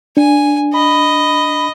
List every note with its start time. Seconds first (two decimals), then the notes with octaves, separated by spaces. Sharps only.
0.17 D4 G#5
0.74 D#5 B5